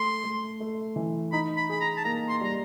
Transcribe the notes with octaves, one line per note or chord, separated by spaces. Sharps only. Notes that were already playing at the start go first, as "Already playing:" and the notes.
Already playing: A3 C6
A3
A3
E3
D#4 B5
B5
G#4 B5
A#5
A5
A#3 A#5
C6
G3 A#5